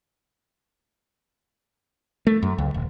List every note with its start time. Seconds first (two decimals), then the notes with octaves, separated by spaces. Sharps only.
2.27 A3
2.42 F#2
2.58 C#2
2.74 D#1